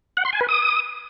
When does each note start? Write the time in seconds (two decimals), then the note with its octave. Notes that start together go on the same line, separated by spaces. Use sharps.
0.17 F#5
0.25 C6
0.33 G#5
0.41 B4
0.49 D#6